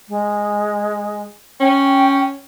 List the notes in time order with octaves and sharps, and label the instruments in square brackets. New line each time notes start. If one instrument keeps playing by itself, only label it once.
[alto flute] G#3
[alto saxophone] C#4 [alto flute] G5